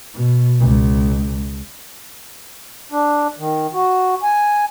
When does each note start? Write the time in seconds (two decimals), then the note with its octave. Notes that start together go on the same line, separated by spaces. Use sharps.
0.14 B2
0.60 C#2
2.92 D4
3.39 D#3
3.73 F#4
4.23 G#5